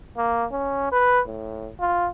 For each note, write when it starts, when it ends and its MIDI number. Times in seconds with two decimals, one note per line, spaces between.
0.17 0.45 58
0.52 0.89 61
0.92 1.20 71
1.27 1.69 45
1.80 2.08 65